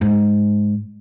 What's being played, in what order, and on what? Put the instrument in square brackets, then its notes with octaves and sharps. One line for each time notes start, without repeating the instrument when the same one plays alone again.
[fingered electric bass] G#2